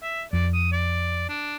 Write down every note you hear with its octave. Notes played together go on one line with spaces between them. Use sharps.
E5
F2 D5
D#6
D5
D4